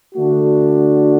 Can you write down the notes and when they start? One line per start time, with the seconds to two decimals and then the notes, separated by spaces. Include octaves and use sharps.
0.15 D3 A3 D4 F#4